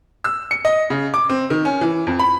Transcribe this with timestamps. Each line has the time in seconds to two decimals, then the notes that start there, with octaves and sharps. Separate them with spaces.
0.24 E6
0.51 C#7
0.65 D#5
0.90 C#3
1.14 D6
1.29 C4
1.50 D#3
1.65 C#4
1.81 E3
2.07 F2
2.19 B5